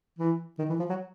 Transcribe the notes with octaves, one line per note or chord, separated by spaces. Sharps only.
E3
D#3
E3
F3
F#3